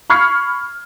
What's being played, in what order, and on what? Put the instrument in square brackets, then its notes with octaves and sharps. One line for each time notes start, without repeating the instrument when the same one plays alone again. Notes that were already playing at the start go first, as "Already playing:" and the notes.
[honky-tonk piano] B5 C#6 F6 G#6 C7 C#7